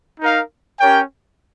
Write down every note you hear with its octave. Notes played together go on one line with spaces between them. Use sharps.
D#4 A#4 F5
C#4 G4 A#4 C#5 G5